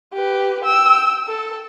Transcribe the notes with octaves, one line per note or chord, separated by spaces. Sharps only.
G4 B4
G5 E6
A4